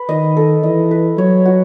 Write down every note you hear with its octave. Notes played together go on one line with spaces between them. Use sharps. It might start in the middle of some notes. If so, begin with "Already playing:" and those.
Already playing: B4
D#3 D#5
A4
E3 D#5
B4
F#3 C#5
F#4